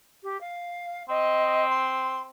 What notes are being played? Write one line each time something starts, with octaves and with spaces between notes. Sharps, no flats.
G4
F5
C4 D#5
C6